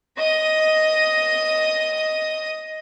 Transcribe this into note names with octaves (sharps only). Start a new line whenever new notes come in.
D#5 D#6